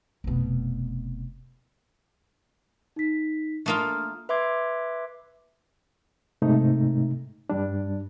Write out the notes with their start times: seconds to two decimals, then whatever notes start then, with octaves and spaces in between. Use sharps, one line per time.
0.24 F1 B2
2.96 D#4 B6
3.66 A3 A#3 D4 F4 D#6 F6
4.29 B4 E5 C6 D6 G#6
6.42 G#2 C3 A3 D#4
7.50 G2 G3 D4